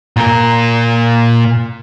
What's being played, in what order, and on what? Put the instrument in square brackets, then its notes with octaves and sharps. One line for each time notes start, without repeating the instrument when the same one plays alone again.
[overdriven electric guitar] A#2 A#4